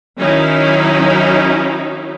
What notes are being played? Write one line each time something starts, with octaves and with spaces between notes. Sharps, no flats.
D#3 F#3 C#4 D#4 E4